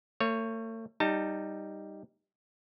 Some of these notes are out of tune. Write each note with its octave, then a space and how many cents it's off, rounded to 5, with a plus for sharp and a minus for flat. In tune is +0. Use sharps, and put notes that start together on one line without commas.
A3 +45 C#5 +0
G3 +0 D#4 +0 A5 +35